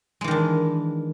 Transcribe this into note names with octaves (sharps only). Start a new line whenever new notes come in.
D#3 E3 G#3 D4